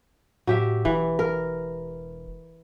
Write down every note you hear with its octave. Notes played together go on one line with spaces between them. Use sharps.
A2 F#3 G4 E5
E1 E3
A#4